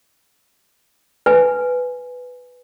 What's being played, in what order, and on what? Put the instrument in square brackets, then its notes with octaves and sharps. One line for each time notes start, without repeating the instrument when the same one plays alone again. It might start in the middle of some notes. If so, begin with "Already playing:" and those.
[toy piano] B4 G#5